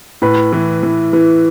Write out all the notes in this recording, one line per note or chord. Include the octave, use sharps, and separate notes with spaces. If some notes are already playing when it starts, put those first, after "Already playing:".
A2 B4
E3
E3
E3